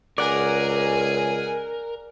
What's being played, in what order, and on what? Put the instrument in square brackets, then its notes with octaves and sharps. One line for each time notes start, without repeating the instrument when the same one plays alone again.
[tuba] C#2 [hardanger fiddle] G#4 G#5 [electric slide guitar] A#4 [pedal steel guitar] D5 F#5